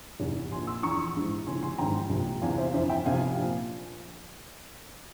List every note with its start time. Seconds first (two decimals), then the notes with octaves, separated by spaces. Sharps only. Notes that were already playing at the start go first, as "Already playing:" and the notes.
0.20 F1 E2 E3
0.51 A#1 A#2 F3 G#5 C6
0.67 C6 E6
0.83 E2 E3 A#5 C#6
1.15 A#1 G#2 E3
1.47 F1 F2 C#3 E3 G#5 C6
1.63 G#5 C6
1.78 G#1 G#2 E3 G5 A#5
2.10 C2 A#2 F3
2.42 E2 C3 E3 F5 G#5
2.58 C5 E5
2.73 G1 F2 E3 C5 E5
2.89 E5 G5
3.05 F1 F2 C3 F5 G#5
3.37 A#2 F3